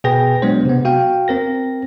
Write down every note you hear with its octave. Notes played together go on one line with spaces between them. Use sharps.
B2 G#4 B4 G5 A#6
F#3 G#3 B3 D4 C5
C3 B3
F#4 F5 G5
C4 A#4 A#6